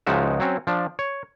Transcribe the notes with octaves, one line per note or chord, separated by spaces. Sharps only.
C#2 F3 G#3 D#4 F#4 E5
F#3 C4 C#4
F3 D4
C#5